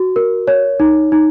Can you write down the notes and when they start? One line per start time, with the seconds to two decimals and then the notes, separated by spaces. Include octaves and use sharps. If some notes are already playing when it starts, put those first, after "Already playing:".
Already playing: F#4
0.16 A#4
0.47 C#5
0.80 D#4
1.12 D#4